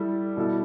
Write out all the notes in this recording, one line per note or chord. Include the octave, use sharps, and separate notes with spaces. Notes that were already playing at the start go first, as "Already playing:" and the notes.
Already playing: G3 E4 A4
B2 G3 E4 A4